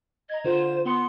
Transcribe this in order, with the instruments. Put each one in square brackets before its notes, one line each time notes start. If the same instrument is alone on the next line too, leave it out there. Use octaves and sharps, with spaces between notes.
[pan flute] D#5 [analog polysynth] A#5 G#6
[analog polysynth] D3 F4 E7 [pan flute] C5
[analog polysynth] B3 C#7 [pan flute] C6